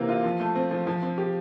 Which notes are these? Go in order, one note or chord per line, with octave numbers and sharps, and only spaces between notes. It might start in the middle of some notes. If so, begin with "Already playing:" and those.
Already playing: C3 E3 A#3
F4
F3
A3
C4
F3
F3
C4
G4